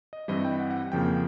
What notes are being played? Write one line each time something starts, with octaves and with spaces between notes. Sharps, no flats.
D#5
G2 E3 G3 C4 E4 D#5
G5
F#5
F#5
F2 C#3 F3 A#3 G5